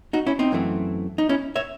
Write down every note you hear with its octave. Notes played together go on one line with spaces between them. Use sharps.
D#4 F#4
C#4 E4
C4 D#4
F#2 E3 A3 C4
D#4
C#4 E4
C#5 E5